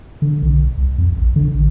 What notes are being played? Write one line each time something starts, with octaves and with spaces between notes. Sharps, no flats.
D3
B1
C2
F2
A#1
D3
A1